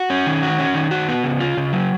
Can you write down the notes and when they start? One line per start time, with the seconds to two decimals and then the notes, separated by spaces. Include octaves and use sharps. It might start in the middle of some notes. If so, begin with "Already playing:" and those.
Already playing: F#4
0.10 C#4
0.27 D#3
0.43 F#4
0.59 C#4
0.75 D#3
0.91 F#4
1.08 B3
1.24 C#3
1.40 F4
1.57 C#3
1.72 F#3